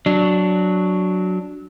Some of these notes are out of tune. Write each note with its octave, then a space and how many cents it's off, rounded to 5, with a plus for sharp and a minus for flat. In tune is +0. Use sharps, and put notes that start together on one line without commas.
F#3 +0 D4 +0